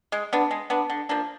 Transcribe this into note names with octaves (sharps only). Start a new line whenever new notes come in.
G#3
B3 D4
G#3
B3 D4
D3
F3 A#3 D4